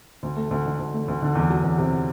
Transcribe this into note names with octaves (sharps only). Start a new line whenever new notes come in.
D2
A3
D2
D3
D2
A3
D2
D3
E2
F#3
E2
C3